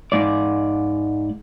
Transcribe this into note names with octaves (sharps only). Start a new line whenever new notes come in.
G#2 D5